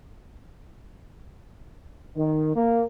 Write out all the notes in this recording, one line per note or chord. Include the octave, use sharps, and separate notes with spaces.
D#3
A#3